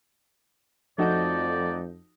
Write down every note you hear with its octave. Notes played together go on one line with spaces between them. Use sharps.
F2 F3 A3 D#4 F#4 D5 A5 G6